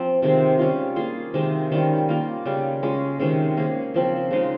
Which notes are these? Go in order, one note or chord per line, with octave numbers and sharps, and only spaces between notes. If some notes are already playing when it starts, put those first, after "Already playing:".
Already playing: F3 C4 F4
C3 D#3 G#3
G3 C#4 F4
A#3 F4 G#4
C3 D#3 G#3
D#3 G3 C#4 F4
A#3 F4 A#4
C#3 G3 C#4
G#3 C#4 F4
C3 D#3 G#3 C#4
A#3 C#4 G#4
C#3 F3 C4
C#3 G#3 D#4 A#4